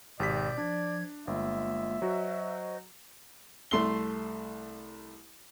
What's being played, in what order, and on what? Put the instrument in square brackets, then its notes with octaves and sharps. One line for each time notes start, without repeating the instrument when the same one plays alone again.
[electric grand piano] G#1 G4 B6 [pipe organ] B2 G6 [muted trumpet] D5
[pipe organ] F3 G#6 [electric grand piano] D4
[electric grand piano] G1 [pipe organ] G#3 A#3 F4 [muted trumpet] E5
[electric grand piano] F#3 F#4 [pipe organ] C5 D#5
[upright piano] C2 A3 C6 C7 G7